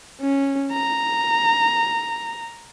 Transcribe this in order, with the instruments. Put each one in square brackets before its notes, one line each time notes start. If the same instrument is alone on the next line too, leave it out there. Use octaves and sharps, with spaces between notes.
[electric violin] C#4
A#5